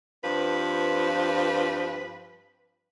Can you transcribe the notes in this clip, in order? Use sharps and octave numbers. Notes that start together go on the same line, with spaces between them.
G2 F3 C4 B4